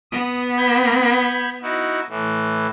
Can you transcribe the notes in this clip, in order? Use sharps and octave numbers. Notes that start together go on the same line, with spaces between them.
B3 D#6
B5 G6 G#6
D#4 E4 F#4
A2 E3